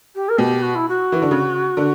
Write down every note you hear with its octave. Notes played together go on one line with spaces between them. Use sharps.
G4
A#4
B2 G4
F#4
E4
F#4
E3
D3
C#3
D3